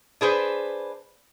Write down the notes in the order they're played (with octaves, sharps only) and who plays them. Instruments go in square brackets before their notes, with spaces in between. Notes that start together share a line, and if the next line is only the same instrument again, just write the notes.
[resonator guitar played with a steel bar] D4 G#4 B4 C5